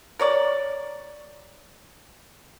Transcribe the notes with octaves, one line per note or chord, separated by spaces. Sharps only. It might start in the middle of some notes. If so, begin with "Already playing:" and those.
A#4 C#5 D5